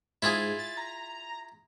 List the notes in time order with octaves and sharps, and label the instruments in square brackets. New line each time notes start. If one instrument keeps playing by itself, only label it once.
[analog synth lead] G#2 [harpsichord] E4 F4 G#4
[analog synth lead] A6
A#5